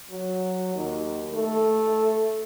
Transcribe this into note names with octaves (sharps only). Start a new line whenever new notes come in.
F#3
D#2
A3